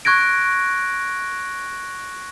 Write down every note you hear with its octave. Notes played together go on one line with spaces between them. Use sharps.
C#6 F#6 G#6 A#6 D7